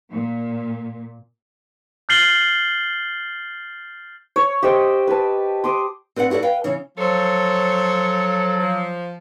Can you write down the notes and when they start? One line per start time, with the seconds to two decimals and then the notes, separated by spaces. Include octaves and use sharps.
0.12 A#2
2.09 F6 G6 A6 C7 F#7 G7
4.36 C#5
4.63 G4 C5 D#5 G5
5.07 B4 A5
5.64 C6 D6 D#6
6.16 C4 B4 D5 F5 F#5
6.30 E4 F#4 G#4 A4 D5
6.42 B4 F5 G5 G#5
6.64 C#3 E3 C#4
6.98 F3 F#3 A4 C5 C#5
8.60 F3